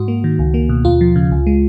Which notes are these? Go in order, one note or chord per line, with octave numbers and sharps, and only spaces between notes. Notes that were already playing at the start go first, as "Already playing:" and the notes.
Already playing: G#2 F#4
A#3
D#3
C#2
A#3
B2
D#2 F4
F3
C#3
C#2
G#3